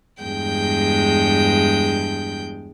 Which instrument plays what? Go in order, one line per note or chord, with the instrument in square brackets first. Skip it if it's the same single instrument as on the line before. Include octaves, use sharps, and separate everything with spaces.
[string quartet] E2 G2 G#3 G5 G6